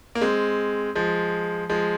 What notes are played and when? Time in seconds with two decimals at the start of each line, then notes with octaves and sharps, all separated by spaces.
0.15 A#3
0.22 G#3 C4
0.95 F3 G#3
1.69 F3 G#3